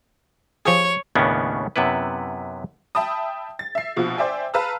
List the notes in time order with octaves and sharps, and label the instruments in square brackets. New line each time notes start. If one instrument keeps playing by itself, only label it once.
[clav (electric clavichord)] F3 G4 G#4 [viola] C#5
[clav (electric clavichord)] D#2 A2 C#3 B3 C#4 D4
F#2 C3 B3 E4 B4
[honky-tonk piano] E5 G5 A5 B5 D#6
A6
E5 C7
A#1 B2 F3
C5 D5 E5 G5 G#5
B4 F5 A5 A#5 E6 F6